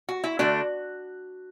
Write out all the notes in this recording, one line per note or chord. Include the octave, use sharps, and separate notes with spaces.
F#4
E4
D3 A3 D4 F#4